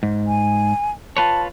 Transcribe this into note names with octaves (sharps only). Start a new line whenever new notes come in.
G#2
G#5
F4 B4 C#5 A5